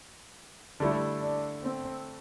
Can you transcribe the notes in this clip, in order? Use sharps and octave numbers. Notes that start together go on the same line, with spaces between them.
D3 G3 A3 E4
D4
C4